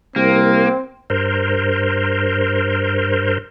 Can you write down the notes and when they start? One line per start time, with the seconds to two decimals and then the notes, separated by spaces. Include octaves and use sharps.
0.16 C2 A#3 C4
1.10 G2 A#4 C5